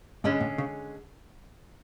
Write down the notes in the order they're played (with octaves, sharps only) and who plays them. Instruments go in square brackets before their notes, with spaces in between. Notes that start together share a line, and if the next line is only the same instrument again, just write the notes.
[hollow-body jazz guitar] G#2 [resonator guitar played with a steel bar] D3 G#3 C#4 G#4
[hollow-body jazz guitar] A2
C#3